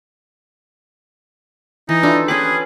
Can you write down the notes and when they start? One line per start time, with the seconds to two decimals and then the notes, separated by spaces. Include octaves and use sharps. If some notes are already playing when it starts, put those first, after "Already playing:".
1.89 E3 D#4
2.03 D4 E4 F4 A4
2.28 C#4 G4 G#4 B4 B5 D6 F#6